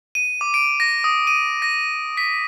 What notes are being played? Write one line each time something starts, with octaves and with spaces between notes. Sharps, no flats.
D#7
D6
D7
A#6
D#6
D#7
A#6
B6